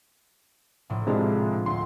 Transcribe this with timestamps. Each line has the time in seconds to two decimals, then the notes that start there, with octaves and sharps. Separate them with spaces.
0.90 A#1 A2
1.07 C3 G#3 D4 E4 F4
1.66 D2 C6